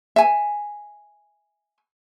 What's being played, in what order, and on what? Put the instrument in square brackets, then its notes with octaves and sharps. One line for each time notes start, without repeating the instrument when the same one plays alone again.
[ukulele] E5 G#5